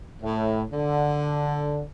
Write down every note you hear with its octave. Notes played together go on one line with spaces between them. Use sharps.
A2
D3